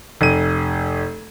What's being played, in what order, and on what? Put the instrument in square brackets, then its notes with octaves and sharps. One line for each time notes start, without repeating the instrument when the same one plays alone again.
[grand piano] F1 D#7